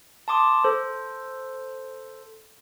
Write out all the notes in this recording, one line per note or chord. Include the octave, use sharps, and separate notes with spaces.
A5 C6 D6 D#6
A4 C5